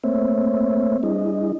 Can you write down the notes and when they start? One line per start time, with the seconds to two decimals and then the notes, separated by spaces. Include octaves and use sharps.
0.04 A3 A#3 C4 C5 C#5 E5
1.03 G3 D4 E4 G#4 D#5